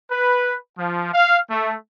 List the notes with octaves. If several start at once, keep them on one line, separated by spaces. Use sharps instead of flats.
B4
F3
F5
A3